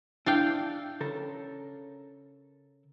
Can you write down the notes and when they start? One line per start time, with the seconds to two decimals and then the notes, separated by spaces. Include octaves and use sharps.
0.26 D4 E4 F5 G5
1.00 C#3 A4 A#4